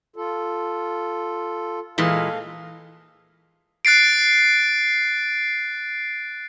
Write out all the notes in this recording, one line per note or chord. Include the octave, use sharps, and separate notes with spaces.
F4 A4
A#2 E3 G#3 A4 F5
F#6 A6 C7 D7